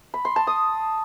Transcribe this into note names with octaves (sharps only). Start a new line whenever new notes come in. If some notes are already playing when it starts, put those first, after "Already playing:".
B5
C6
A5
D#6